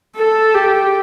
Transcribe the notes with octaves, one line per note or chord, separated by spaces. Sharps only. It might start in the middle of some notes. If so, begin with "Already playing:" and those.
A4
G4